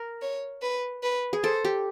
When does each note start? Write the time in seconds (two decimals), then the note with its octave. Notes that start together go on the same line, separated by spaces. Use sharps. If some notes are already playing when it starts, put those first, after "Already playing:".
Already playing: A#4
0.22 C#5
0.62 B4
1.03 B4
1.33 G#4
1.44 A4 C5
1.65 G4